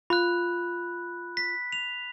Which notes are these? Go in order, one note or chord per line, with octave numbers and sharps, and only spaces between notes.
F4 B5 F#6
B6
F7